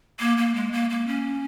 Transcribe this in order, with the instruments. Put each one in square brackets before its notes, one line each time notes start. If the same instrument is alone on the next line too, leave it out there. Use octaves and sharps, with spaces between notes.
[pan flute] A#3
A#3
G#3
A#3
A#3
C#4